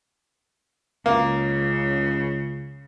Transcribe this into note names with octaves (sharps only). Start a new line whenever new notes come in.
C#2 C#3 A#3